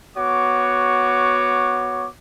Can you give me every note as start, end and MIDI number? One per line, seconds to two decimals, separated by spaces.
0.16 2.07 59
0.16 2.07 66
0.16 2.07 73
0.16 2.07 86